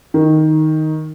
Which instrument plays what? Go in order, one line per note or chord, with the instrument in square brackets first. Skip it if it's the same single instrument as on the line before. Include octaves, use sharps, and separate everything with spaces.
[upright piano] D#3